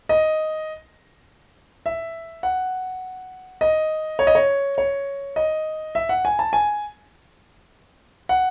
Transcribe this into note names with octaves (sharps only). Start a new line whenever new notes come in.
D#5
E5
F#5
D#5
C#5
D#5
C#5
C#5
D#5
E5
F#5
G#5
A5
G#5
F#5